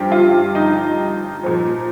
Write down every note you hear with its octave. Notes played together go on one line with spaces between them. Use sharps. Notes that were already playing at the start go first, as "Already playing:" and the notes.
Already playing: G2 F3 G4
F4
D#4
A#2 F3